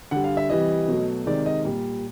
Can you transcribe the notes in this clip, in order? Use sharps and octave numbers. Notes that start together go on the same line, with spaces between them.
D3 G3 F#5
F5
E5
C3 E3 G3 D#5
B2 F#3 A3
C3 D#3 G#3 D5
D#5
A#2 G3